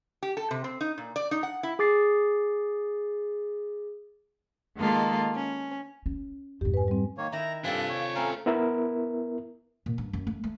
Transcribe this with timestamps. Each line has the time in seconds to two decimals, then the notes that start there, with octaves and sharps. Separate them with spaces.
0.23 G4
0.37 A4
0.51 C3
0.64 C4
0.81 D#4
0.98 A#2
1.16 D5
1.31 D#4
1.43 F#5
1.63 E4
1.79 G#4 D6 A6 C7
4.77 D#3 G#3 A#3 F4 A4
5.36 C#4
6.06 C#4
6.61 F2 G#2 G4
6.74 B4 G#5
6.88 G3 C4
7.18 D#3 A#3 C#5
7.32 D#3 E4 E5 A#5
7.64 G2 C4 F4 A4 D5 F5 G#5 F#6
7.89 C#5
8.15 A3 C4 C#4 F5 A#5
8.46 B3 E4 A#4 E5
9.86 A#2
9.98 G2
10.13 F#2
10.27 A3
10.44 A3